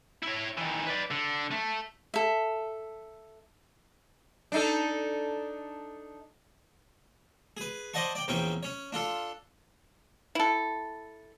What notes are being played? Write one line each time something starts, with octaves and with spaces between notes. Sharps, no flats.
E4 C#5
D#3 E3
B4 D5
D3
A3
A4 E5
D4 D#4 A4
G#4 B4
C5 D5 D#5 F#5 A5 C#6
D5 G5
A#1 E2 C#4 G5 C#6
C#4 C#5
D4 F4 A4
E4 A4